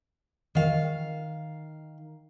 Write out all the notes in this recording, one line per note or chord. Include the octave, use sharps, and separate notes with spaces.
D#3 F5